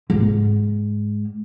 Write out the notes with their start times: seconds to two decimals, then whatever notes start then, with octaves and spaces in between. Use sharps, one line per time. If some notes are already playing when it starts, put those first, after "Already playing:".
0.10 G#2